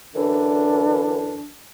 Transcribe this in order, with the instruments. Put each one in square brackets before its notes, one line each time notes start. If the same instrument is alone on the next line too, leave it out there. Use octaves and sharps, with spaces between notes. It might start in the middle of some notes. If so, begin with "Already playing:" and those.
[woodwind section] F#2 D3 E3 [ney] D4